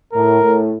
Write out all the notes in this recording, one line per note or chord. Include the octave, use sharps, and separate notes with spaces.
A2 A#4
A2